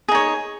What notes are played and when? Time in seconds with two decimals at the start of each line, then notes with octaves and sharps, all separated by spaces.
0.08 G#4
0.12 D#4
0.15 C#5